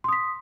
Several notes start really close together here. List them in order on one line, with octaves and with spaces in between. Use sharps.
C6 D#6 B6